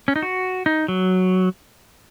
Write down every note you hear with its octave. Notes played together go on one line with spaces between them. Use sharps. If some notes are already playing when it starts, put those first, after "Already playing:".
C#4
D#4
F#4
D#4
F#3